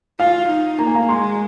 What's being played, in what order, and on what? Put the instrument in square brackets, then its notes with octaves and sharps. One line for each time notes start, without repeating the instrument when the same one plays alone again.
[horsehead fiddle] F4 [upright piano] F5
[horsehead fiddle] D#4
[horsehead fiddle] A#3 [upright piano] A#5
[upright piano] G#5
F5 A#5
[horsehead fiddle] G#3 [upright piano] G#5 C6